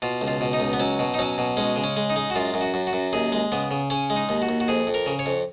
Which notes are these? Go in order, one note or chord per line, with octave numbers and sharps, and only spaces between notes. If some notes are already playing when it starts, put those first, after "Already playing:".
B2 F4
C#2
F4
B2
D#4
C#2
B3
F#3 C#4
B2
D#4
F#3 C#4
B2
G#3 C#4
C#3
C#4
G#3
D#4
G#3
F#4
F#2 F4
F#2
F#4
F#2
F#4
F#2
D#2 G#4
G#3
C#3 B3
C#3
C#3 C#4
G#3
D#4
D#2
F#4
D#2
F#4
F2 G#4
F2
A#4
C#3
C#5
F2